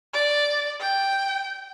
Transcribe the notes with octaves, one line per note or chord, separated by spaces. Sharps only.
D5
G5